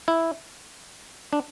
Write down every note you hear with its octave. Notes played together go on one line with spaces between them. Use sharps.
E4
D4